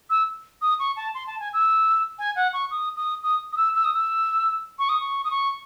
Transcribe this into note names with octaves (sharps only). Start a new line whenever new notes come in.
E6
D#6
C#6
A5
C6
A5
G#5
E6
G#5
F#5
C#6
D#6
D#6
D#6
D#6
E6
E6
D#6
E6
C#6
D#6
C#6
D#6
C#6